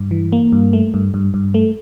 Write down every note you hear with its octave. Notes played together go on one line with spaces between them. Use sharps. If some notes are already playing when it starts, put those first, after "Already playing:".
Already playing: G2
E3
A#3
G2
A3
G2
G2
G2
A3